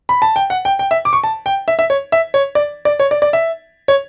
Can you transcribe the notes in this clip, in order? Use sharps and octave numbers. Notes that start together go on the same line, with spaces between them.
B5
A5
G5
F#5
G5
G5
E5
D6
C#6
A5
G5
E5
E5
C#5
E5
C#5
D5
D5
C#5
D5
D5
E5
C#5